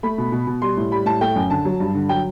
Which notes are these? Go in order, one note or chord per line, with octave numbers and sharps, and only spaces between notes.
A3 B5
B2
B2
B2
G3 C6
A2
G3 B5
A2 A5
A3 G5
F#2
D3 A5
F#3
G2
D3
F#3 G5